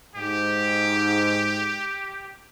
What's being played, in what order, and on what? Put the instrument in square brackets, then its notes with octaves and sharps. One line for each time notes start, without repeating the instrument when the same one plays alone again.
[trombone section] G#2 [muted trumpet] G4